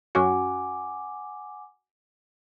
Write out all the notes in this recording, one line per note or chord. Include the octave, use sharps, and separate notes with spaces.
F#2 C#4 F#4 F#5 G#5 D6